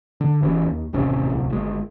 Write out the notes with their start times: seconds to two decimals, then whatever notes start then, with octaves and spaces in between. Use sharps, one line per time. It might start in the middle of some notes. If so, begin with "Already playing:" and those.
0.21 D3
0.41 E1 E3 C4 C#4
0.65 D#2
0.93 D#1 A1 C3 C#4
1.29 D1 C2
1.50 G1 G#3